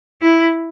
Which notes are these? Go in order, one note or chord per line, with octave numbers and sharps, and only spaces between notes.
E4